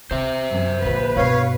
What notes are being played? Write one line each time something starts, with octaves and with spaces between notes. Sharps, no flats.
C3 C5 E5
F#2
A#1 D3 B4
G2 B2 C#5 F5